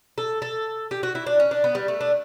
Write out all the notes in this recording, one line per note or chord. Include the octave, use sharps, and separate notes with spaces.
A4
A4
G4
F#4
E4
D4
C#4
D4
B3
G3
A3
D4